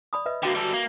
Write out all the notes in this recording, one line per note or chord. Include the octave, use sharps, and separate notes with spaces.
D5 B5 D#6
B4 D#5 E5
D3 A#3 F#4 G5
G3 A4
A#3